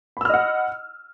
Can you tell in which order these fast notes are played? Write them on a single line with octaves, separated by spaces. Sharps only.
B5 E6 F6 D#5 F#5